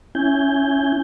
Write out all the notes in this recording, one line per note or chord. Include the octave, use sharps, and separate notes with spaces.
C#4 E4 G#5 G6